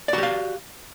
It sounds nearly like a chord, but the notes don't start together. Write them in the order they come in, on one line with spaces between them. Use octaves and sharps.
D5 F#4 G4 F5